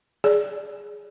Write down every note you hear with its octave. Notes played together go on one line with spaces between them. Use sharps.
G#4 D5